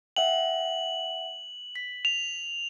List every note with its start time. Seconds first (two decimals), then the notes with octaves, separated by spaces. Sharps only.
0.16 E5 F#5 G5 F#7
1.76 B6
2.05 F7